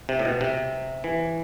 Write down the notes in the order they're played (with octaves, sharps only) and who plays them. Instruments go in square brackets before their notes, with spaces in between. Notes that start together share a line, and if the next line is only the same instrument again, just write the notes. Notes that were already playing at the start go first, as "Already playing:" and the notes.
[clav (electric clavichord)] C3
A2
B2
C3
E3